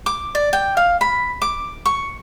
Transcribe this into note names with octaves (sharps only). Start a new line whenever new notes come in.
D6
D5
G5
F5
B5
D6
C#6